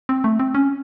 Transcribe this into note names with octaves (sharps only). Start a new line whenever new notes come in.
C4
A3
C4
C#4